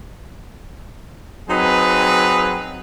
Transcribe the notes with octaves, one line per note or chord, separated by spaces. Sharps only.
F#3 C4 D#4 G#4 B4